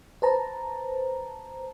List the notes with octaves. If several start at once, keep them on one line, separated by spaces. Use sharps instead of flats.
B4 C5 A5 A#5